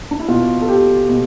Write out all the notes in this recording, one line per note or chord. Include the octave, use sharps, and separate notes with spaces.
D4
E4
B2 F4
A4
G4
B2